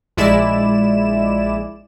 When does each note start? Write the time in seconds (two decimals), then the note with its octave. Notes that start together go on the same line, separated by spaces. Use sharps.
0.17 A#1 G#3 E4 D5 E7